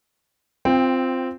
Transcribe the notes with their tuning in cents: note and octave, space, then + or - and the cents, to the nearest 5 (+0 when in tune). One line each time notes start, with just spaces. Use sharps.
C4 -5 F4 +0 G5 +20